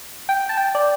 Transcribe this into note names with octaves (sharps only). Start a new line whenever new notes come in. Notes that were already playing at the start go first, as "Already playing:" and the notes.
G5
A5
G5
D5